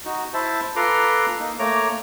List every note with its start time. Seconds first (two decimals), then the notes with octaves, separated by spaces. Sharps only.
0.05 D#4 F#4
0.34 E4 C5 E5 A5
0.76 F4 A4 B4 A#5 C6 D6
1.40 A#3 D#4
1.59 A3 A#3 C#5 A#5 D6